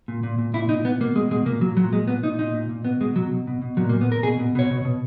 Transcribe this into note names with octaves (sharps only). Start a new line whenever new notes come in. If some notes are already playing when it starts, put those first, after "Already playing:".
A#2
A#2
A#2
A#2 E4
A#2 D#4
A#2 B3
B2 A#3
B2 G#3
B2 G#3
A#2 A#3
A#2 F#3
A#2 F#3
A#2 G#3
A#2 B3
A#2 D#4
A#2 D#4
A#2
A#2
B2 B3
B2 G#3
B2 F#3
B2
B2
B2
A#2 F#3
A#3
A#2
B3
A#2 A#4
B2 G#4
B2
B2 C#5
B2
B2